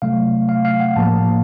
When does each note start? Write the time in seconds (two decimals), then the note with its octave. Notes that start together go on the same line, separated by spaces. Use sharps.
0.02 C3 F#3 A3 F5
0.49 F5
0.65 F5
0.80 F#5
0.96 A2 F3 A#3 A5